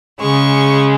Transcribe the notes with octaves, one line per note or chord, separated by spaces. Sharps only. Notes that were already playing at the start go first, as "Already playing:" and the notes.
C#3 G#3 C#6